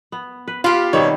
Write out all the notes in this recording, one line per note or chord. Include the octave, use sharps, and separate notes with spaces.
B3
B4
F4 G4 B4 F5
B2 D#3 G3 C4 C#5